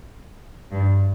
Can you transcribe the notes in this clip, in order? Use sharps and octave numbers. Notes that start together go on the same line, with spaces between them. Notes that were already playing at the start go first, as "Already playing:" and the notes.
G2